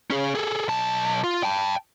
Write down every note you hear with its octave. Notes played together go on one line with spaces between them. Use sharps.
C#4 G#4
G#4 A4
B1 A5
F4
G5 A5